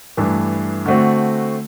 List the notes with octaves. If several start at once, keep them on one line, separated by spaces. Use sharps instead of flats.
G2 E3 A3 D4
D3 A3 C4 F#4